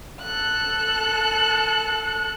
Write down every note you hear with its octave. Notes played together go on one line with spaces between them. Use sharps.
A4 F#6